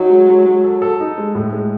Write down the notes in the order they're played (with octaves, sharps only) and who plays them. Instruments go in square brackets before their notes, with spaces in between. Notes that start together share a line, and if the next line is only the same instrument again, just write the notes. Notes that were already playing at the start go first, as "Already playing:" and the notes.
Already playing: [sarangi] F#3 [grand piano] D#4
[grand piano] G#3
G#3
G#3
A4
A4
D#4
G#3
A2
G#3